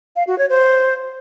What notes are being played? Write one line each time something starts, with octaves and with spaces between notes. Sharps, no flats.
F5
F#4
C#5
C5